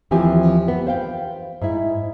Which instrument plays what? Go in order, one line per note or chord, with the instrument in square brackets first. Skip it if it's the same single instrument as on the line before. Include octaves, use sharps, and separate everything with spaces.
[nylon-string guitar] D#2 E3 F3 C4 G4 G#5
B3
C5 F5 G5
G#2 E4